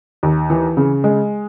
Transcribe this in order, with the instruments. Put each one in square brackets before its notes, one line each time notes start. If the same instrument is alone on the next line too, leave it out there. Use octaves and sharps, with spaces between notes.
[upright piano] D#2
E3
C#3
G#3